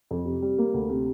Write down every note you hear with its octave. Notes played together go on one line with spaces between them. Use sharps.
F2
C3
G3
A#3
D2
C3